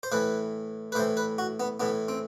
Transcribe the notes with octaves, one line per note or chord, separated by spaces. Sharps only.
C5
A2 E3 B4
B4
A2 E3 C5
B4
F#4
B3
A2 E3 B3
C4